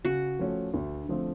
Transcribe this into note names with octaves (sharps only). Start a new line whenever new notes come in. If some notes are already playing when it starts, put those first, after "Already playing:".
C#3 F#4
F3 A3 C#4
D2
D3 F3 A3 C4